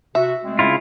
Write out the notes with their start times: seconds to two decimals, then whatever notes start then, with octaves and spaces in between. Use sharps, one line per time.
0.15 C3 F#4 E5
0.45 G#3 A3 C4
0.59 C#3 E4 F4